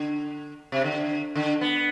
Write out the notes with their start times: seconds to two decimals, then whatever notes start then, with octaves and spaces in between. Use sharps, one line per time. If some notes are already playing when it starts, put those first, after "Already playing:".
Already playing: D3
0.72 C3
0.84 D3
1.35 D3
1.61 B3